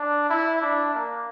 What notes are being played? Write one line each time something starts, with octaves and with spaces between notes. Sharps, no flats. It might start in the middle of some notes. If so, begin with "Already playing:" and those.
Already playing: D4
E4
D4
A#3